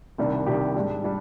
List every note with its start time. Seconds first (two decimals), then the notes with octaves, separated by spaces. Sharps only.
0.18 C2 C3 D#3 G3 D4
0.46 C2 C3 D#3 G3 D4 G4
0.76 G#2 G3 D4
1.04 G3 D4